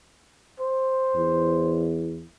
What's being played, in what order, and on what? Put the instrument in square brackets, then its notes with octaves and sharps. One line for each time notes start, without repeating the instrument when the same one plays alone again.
[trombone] C5
[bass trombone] E2